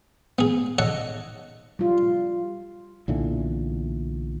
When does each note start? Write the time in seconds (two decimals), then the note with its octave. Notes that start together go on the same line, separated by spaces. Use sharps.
0.39 B3 G#4
0.79 A4 C#5 D#5 F#5
1.79 G3 F4
3.08 B1 A#2 D3 E3